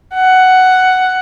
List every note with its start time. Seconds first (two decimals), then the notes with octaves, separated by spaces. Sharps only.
0.14 F#5